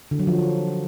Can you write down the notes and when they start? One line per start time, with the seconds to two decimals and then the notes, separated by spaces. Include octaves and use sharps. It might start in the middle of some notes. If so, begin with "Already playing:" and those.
0.11 D3
0.19 F#3
0.27 F3